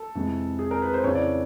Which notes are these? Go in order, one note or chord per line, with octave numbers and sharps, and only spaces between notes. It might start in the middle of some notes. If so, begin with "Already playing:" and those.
Already playing: A4
F2 C3 E3 G#3
G#4
A#4
B4
C5
F2 C#3 E3 C#5
D5